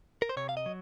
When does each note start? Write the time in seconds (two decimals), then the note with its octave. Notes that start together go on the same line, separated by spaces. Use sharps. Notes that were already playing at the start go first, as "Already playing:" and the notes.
0.22 A#4
0.29 C5
0.37 C3 C#5
0.49 F5
0.57 D#5
0.66 F#3